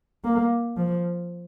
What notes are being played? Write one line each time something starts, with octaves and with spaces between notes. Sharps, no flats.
A#3
F3